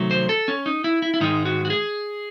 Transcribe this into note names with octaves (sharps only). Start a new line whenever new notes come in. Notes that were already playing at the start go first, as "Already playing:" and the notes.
Already playing: C3 D#3 F#3 A3
C5
A4
C#4
D#4
E4
E4
E4
G#2 D#3 G#3 D#4
F#4
F#4
G#4